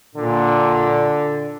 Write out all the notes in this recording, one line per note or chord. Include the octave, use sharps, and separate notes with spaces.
A#2 D3